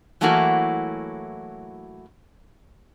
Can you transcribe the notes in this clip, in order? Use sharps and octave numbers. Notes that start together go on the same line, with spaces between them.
E3 F#3 A3 A#3 E4 F#4